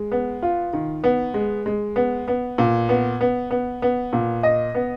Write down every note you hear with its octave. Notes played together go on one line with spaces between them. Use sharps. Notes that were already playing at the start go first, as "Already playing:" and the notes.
Already playing: G#3
B3
F4
D#3
B3
G#3
G#3
B3
B3
A#2
B3
B3
B3
B3
A#2
D#5
B3